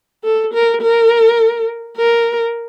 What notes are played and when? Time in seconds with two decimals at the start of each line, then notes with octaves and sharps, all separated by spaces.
0.24 A4
0.54 A#4
0.82 A#4
1.97 A#4